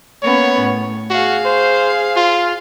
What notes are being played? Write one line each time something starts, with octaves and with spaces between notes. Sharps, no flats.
A#3 B3 C#4 C#5
A2
F#4 G#4 F5
C5
F4